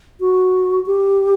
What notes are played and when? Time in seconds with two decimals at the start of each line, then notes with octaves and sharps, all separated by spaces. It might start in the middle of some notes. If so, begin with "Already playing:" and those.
0.20 F#4
0.86 G4